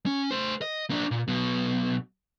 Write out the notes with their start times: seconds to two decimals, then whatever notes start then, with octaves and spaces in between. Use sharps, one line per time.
0.06 C#4
0.31 A3 C5
0.62 D#5
0.90 A#3 D4
1.11 A#2
1.27 B1 B2